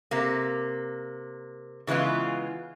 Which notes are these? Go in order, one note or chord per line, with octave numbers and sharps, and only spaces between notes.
C3 A#3
C#3 E3 G#3 B3 F4